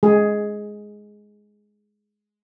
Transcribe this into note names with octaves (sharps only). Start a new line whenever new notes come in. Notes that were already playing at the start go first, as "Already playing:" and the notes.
G#3 G#4